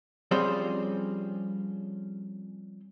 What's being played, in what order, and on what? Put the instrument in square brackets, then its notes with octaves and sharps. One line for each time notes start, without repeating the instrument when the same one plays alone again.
[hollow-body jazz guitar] F3 G3 C4 C#4 G#4 C5